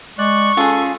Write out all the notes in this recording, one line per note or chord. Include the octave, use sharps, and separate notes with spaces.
G#3 D5 C#6 F#6
C#4 F4 G#4 A4